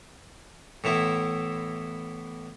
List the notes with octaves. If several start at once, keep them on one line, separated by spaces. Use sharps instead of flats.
A2 E3 B3 E4